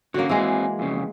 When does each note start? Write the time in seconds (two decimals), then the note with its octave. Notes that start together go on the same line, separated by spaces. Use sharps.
0.14 D3 A#3 C#4 F#4
0.29 E3 G#3 C4 G#4
0.79 F2 C#3